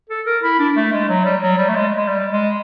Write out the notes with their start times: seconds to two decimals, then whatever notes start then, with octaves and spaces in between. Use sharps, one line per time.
0.10 A4
0.26 A#4
0.43 E4
0.59 D4
0.76 A3
0.93 G#3
1.09 F#3
1.25 G3
1.42 F#3
1.58 G3
1.69 A3
1.75 G#3
1.97 G#3
2.08 G3
2.32 G#3